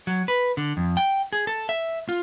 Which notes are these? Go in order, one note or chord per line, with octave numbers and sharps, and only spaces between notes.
F#3
B4
D3
F2
G5
G#4
A4
E5
F4